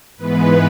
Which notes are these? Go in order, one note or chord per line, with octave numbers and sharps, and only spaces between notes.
G#2 E3 G#3 B3 B4